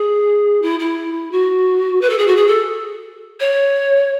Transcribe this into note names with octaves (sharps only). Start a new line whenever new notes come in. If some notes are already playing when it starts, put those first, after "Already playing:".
Already playing: G#4
E4
E4
F#4
B4
A4
G#4
F#4
G#4
A4
C#5